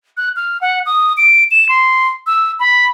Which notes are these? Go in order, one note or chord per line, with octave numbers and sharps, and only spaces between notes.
F#6
F6
F#5
D#6
D7
E7
C6
E6
B5